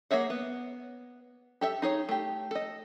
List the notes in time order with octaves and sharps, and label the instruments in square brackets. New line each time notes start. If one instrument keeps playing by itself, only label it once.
[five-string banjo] A#3 G#4 C#5 E5 F#5
B3
G4 A4 E5
D#4 G#4 C#5
A3 G4
A4 D#5